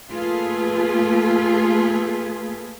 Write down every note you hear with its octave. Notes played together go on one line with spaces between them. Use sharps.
A3 A#3 F4 G#4 A4 B4